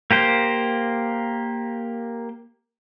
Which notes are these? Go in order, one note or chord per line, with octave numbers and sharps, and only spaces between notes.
A#3 G4 C5